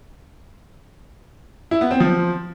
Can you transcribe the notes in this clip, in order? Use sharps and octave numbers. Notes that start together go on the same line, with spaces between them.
E4
B3
C4
F3